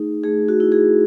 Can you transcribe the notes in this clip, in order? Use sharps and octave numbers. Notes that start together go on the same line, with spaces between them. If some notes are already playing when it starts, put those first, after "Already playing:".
Already playing: A3 D#4 G#4
A3 G#4
F#4
E4
G#4